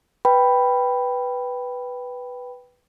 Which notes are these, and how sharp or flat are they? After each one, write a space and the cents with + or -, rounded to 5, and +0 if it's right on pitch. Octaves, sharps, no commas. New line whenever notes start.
B4 +0 G5 +0 B5 +0